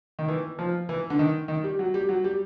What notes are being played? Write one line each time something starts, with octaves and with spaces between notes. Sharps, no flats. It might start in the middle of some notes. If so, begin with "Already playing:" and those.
D#3
E3
F3
E3
D3
D#3
D#3
G3
F#3
G3
F#3
G3